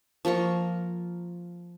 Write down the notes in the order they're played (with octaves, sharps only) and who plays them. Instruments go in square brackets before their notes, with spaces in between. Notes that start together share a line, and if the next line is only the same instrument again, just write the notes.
[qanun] F3 A#3 A#4 C#6